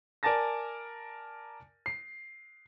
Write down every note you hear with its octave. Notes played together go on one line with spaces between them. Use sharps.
A#4 D5 G#5 A5 A6 A#6
C7